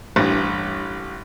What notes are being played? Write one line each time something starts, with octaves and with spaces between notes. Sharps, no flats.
A1 G2